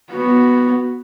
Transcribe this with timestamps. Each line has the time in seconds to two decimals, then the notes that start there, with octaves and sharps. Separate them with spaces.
0.12 B3 F#4